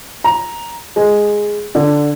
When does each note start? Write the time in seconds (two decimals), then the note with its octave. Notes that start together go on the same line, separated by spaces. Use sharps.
0.24 A#5
0.96 G#3
1.75 D3